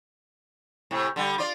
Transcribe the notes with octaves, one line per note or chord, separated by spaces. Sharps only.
A2 C3
D3 G3
F4 D5